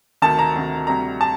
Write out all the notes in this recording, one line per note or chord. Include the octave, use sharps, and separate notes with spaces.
D2 C3 D#3 A5
A#5
D2 C3 D#3
D2 C3 G3 A#5
A5